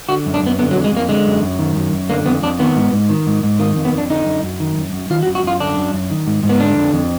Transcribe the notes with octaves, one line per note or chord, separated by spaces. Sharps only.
D3 F#4
F#2
D4
F#2 B3
D3 B3
F#3
F2
G#3
F2 A#3
D3 G#3
F#2
F#2
D#3
F#2
F#2
D3 A#3
F2 B3
F2 D4
D#3 B3
G#2
G#2
D#3
G#2
G#2
D#3 A#3
F2
B3
F2
D4
D3 D#4
F#2
F#2
D#3
F#2
F#2
D#3 F4
F#4
F#2
F#4
F#2 F4
D3 D4
F#2
F#2
D#3
G#2
G#2
B3
D3 D4
F2
F2